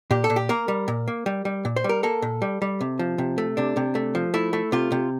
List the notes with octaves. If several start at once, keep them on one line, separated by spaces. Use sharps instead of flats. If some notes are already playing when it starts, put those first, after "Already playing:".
A#2 G4
A4
A#2
G4
A#3 A#4
G3
A#2
A#3
G3
G3
A#2
C5
G3
A#4
A#3 A4
A#2
G3
G3
C3
F3
C3
A3
C3 D4
C3
A3
F3
A3 E4
A3
C3 F4
C3